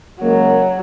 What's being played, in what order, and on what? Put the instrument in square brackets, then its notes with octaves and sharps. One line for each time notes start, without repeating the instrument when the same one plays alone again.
[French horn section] C#3 G#3 A#3 [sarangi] F#3